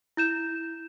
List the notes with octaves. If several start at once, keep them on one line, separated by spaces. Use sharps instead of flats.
E4 G6 E7